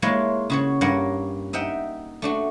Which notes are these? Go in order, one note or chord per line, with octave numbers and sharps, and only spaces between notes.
G#3 A#3 E4 F4 C#5
C#3 F#4 C#5
G2 A#3 C#5 F#5
D#4 E5 F#5 G5
A3 D4 F#4